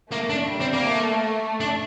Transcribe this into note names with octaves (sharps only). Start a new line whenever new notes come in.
A3 A#3
D4
G3
C4
A#3
A3
A3
D4